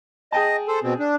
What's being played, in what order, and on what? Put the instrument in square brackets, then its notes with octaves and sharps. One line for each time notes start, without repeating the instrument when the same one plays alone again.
[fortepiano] G#4 G5 A5 [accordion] D#5
[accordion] A4 C5
B2 C4
D4